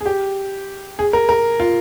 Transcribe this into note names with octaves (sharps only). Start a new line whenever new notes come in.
G#4
G4
G#4
A#4
A#4
F4